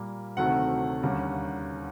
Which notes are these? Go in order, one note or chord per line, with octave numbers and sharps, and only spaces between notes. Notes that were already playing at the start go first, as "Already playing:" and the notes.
Already playing: A#2 G3 A#3
D2 C3 D#3 F#3 A3 F#5
D#2 D3 G3 A#3 C#4